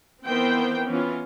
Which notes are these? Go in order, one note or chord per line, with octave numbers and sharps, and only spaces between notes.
D#3 E3 B3 C4 C5 G5
E3 B3 C#4 F4